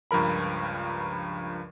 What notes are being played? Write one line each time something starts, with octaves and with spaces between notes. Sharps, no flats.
C#2 G2 F3 A#4 B5